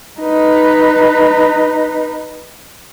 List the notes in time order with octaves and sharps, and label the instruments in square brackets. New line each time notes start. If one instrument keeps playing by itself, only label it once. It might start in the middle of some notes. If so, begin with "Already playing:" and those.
[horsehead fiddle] D#4 B4